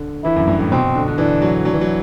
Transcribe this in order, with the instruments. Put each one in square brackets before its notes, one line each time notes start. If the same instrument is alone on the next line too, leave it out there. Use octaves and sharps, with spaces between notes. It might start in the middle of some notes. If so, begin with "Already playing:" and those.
Already playing: [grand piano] D3
[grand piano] E3 [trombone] E4
[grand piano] F#2
G2
A2
[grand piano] B2 [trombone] C4
[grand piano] D3
D3
[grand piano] E3 [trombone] D4
[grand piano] F#3
[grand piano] F#3 [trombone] D4
[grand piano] E3
F#3